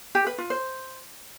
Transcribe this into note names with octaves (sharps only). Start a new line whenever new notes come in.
G4
B4
F4
C5